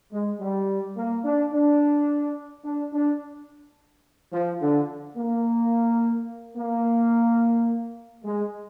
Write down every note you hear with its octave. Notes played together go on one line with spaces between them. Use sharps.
G#3
G3
A#3
D4
D4
D4
D4
F3
D3
A#3
A#3
G#3